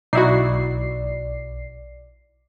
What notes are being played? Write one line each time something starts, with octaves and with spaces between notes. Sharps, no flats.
B1 D#4 E4 F#4 D5 C7